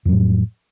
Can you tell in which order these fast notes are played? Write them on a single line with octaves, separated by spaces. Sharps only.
F2 F#3 A2